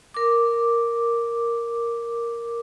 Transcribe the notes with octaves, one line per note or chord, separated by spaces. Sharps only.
A#4 D6